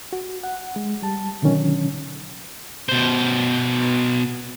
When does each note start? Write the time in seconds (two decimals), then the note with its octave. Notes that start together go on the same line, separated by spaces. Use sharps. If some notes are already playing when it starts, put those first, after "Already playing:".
0.13 F#4
0.43 F#5
0.76 G#3
1.02 G3 A5
1.42 B2 D3 D#3 F#3 C#4
2.89 B2 C5